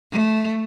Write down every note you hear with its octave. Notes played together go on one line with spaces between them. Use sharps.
A3